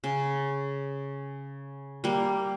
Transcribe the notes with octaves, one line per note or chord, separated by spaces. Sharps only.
C#3
G3 A#3